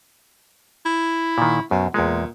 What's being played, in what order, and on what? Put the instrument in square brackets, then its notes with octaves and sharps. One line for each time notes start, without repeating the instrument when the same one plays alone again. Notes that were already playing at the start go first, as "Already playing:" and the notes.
[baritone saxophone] E4
[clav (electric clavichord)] A#2 D#3
[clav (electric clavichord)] F#2 [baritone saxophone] B2
[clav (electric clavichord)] E2 G#3 [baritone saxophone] A#2